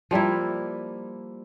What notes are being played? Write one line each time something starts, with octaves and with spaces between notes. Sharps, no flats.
F3 G3 A#3 E4